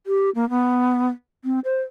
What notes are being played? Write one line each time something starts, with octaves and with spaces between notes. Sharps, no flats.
G4
A#3
B3
C4
C5